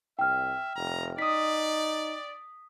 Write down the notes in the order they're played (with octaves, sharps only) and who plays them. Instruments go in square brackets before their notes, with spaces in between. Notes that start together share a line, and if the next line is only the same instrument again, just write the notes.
[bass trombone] C2 [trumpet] E5 [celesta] G5 F6
[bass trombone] F1 [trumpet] A#5
[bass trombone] D#4 [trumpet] D5 [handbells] D#6 B6